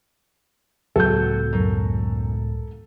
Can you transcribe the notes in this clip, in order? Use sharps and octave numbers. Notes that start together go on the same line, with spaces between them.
C#2 A2 F#3 B3 A4 G6
F#2